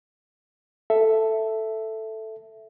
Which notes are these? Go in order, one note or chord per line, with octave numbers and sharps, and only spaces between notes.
A4 E5